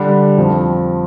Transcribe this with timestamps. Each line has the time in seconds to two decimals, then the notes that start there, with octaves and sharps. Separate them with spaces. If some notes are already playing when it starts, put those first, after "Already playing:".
Already playing: D3 G3 D4
0.38 F2 F3 C4